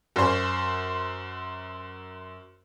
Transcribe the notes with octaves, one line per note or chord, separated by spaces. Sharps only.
F#2 C5